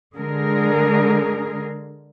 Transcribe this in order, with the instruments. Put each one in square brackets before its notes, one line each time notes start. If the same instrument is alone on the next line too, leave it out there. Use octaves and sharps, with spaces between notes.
[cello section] D3 G#3 G#4 A#4